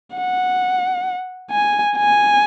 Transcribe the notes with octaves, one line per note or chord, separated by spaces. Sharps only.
F#5
G#5
G#5